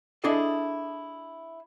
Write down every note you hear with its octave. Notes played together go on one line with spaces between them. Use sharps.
D4 E4 G#4 A4 D#5